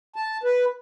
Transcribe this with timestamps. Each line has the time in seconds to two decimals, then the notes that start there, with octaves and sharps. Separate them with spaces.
0.16 A5
0.43 B4